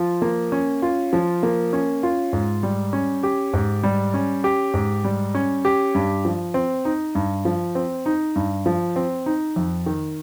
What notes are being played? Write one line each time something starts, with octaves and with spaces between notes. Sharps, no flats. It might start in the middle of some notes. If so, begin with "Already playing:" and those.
Already playing: F3 F4
A#3
C#4
F4
F3
A#3
C#4
F4
G#2
G3
C#4
G4
G#2
G3
C#4
G4
G#2
G3
C#4
G4
G2
F3
C4
D#4
G2
F3
C4
D#4
G2
F3
C4
D#4
F2
D#3